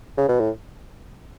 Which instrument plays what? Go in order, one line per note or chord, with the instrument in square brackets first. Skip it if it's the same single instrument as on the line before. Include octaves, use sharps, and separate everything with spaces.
[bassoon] C#3
B2
A2